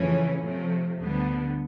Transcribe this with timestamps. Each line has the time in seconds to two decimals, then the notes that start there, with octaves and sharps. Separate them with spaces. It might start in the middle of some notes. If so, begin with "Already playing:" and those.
Already playing: F2 C#3 E3 A3 C#4
0.42 C3 F3 A3
0.98 D2 D3 G3 B3